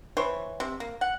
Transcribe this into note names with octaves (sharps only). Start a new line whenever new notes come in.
E3 C5 C#5
C3
A#3
F#5